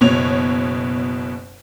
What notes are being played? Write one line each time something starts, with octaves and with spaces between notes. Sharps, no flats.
F#1 B2 C#5 F7